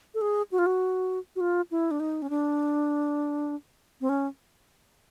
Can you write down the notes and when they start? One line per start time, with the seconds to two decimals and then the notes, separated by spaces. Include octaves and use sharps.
0.14 A4
0.21 G#4
0.52 F#4
0.59 F4
0.66 F#4
1.36 F#4
1.41 F4
1.71 E4
1.91 D4
2.00 D#4
2.22 C#4
2.30 D4
4.01 C4
4.09 C#4